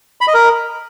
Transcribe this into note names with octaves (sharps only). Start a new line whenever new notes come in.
B5
D#5
A#4